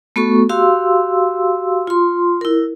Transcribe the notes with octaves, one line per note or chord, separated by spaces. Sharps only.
A3 B3 F#4 A4 C#6
F#4 G4 F5 C6 E6
F4 C6
E4 A#4